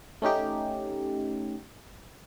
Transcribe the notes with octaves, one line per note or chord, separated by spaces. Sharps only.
A3 C#4 D#4 G4